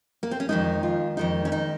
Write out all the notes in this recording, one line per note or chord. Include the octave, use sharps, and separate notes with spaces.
A#3
C4
C#4
F2 D#3 G#3 D#4
F4
F2 D#3 G#3 D#4
C#4
D#4